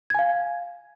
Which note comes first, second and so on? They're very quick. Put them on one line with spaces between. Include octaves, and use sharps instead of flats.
G#6 G#5 F5